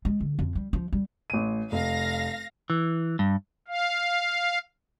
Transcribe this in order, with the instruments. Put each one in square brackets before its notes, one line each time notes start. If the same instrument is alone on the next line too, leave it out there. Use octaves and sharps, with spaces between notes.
[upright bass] G#3
D3
F2
G3
F3
G3
[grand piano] A1 D#7
[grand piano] F1 [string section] F5 A#6
[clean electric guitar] E3
G2
[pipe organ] F5